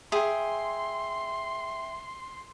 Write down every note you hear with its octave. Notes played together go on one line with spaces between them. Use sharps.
G#4 E5 G5 C6